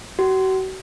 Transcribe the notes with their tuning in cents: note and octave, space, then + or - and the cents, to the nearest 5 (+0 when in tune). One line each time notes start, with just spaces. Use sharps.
F#4 +40